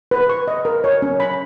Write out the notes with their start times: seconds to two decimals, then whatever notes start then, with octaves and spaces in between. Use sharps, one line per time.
0.11 B4
0.29 C#6
0.48 D#5
0.65 A#4
0.84 C#5
1.02 C#4
1.20 B5